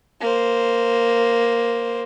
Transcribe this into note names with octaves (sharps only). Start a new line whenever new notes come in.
A#3 C5